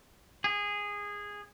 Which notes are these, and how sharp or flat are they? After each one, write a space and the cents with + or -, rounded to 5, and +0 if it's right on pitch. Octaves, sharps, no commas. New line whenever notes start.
G#4 -15